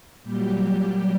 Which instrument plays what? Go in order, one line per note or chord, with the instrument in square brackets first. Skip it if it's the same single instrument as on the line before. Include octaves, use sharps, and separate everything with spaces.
[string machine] A#2 F#3 G3 G4